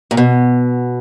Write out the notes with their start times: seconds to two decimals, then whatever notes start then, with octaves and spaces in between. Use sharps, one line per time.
0.11 A#2
0.17 B2